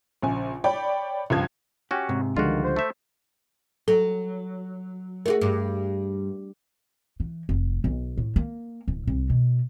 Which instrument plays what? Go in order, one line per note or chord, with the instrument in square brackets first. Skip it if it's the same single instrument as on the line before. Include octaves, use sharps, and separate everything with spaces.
[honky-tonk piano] A#1 C#3 G#5
C#5 D5 G5 B5
C#2 G2 F3 G#6
[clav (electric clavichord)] C#4 F#4 [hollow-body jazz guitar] G4
[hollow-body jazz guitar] G#2 C3
[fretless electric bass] C#2 D3 G#3 [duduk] D#3 [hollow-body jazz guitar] F3 G3 [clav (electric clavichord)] F4 F#4
[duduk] C5
[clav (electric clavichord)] A3 E5
[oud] F#3 [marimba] A4
[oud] A3 F4 F#4 [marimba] G#4 A#4
[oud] G2
[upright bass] E3
F1
B1
A2
A#3
D1
C2
B2